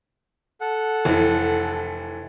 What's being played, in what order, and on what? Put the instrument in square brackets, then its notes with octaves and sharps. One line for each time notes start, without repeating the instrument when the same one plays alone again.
[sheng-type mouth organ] A4 F#5
[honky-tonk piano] F1 E3